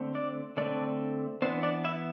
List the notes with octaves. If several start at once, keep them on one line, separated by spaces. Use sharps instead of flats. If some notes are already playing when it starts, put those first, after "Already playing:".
Already playing: D3 A3 C4
D4 D5
D3 A3 C4 D4 D5
E3 B3 C4 D4 C5
D4 D5
E4 E5